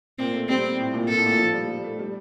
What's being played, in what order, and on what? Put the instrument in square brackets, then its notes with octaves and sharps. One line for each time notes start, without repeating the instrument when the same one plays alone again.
[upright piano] A#2 [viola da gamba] C4
[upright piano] A3
[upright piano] G3 [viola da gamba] C4
[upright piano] A2
A#2
[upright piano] A#2 [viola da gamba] A4
[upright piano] A2
A#2
F3
G3
G3
A3
G3